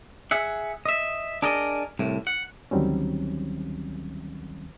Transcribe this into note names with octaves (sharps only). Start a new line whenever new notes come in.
G#4 E5 F#5
D#5 E5
D4 G#4 A#4 D5 D#5
C2 A2
F#5
D2 D#3 F#3 G3 C4 C#4